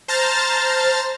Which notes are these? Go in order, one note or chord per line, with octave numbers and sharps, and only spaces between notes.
C5 A5 A#5 F6 A6